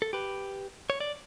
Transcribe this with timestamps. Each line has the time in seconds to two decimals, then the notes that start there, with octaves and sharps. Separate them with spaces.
0.02 A4
0.13 G4 B4
0.90 C#5
1.00 D5